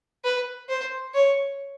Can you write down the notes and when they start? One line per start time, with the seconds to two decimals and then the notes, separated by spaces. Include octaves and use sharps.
0.25 B4
0.69 C5
1.14 C#5